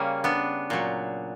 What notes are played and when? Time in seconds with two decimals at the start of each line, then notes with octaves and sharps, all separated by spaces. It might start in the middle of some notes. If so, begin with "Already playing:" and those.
Already playing: C#3 G3 A#3 C#4
0.24 B3 D4
0.70 A#2 F#3